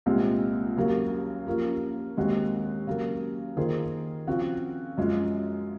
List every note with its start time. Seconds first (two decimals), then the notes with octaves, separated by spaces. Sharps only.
0.06 C2 A#2 G#3 C4
0.76 D#2 C#3 F#3 A#3
1.47 F3 A#3 C#4
2.17 D#2 D#3 G#3 C4 F#4
2.87 C#3 F#3 A#3
3.57 D#3 A#3 F4 G#4 C5
4.27 C#3 F3 C4 F#4
4.97 F#2 F3 G#3 C#4